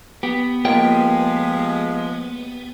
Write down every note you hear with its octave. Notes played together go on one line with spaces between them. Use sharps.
B3 G4
F3 G#3 A#3 F4 G4 C#5 G5